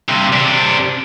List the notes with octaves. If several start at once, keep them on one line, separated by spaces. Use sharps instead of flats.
G2 C3
C3 D4